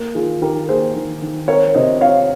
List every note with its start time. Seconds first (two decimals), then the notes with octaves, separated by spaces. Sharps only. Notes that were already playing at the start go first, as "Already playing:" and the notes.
Already playing: A#3
0.15 D#3 F4 G#4
0.41 D#3 G4 A#4
0.69 A#3 G#4 C5
0.95 D#3
1.22 D#3
1.48 C4 A#4 C#5
1.75 C3 C5 D#5
2.01 C4 C#5 F5